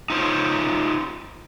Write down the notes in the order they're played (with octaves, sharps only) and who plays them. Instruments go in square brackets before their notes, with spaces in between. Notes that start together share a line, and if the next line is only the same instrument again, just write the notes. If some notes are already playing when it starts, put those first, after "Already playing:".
[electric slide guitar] D#4 F4 C5 C#5